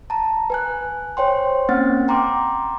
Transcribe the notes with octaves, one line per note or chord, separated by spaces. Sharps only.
A5 A#5
B4 G#5 F#6
C5 C#5 G5 C6
A#3 C4 C#4 F#5 F6 A6
G5 A#5 C6 D6